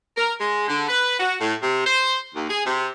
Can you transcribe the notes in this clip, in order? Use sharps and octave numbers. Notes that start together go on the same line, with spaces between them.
A#4
G#3
D3
B4
F#4
A2
C3
C5
D#2
G#4
C3